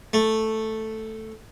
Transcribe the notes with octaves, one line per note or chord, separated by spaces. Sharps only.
A3